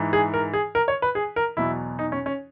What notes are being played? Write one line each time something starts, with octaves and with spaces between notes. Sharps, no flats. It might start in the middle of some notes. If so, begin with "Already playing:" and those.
Already playing: G#2 E3
G#4
A#4
G#4
A#4
C#5
B4
G#4
A#4
E2 B2 F#3 E4
D#4
C#4
C#4